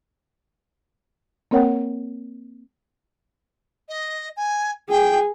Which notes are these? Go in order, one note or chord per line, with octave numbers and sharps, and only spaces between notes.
A#3 C4 A#4 C#5 F#5 G5
D#5
G#5
G#4 G5